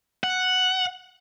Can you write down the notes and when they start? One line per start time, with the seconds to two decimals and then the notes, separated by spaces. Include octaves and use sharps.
0.24 F#5